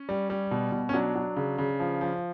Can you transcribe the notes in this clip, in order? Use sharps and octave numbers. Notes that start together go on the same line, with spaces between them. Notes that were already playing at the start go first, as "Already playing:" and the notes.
Already playing: C#4
G3
G3
B2
B2
C#4
F#3 D4
F#3
C#3
C#3
F3
F3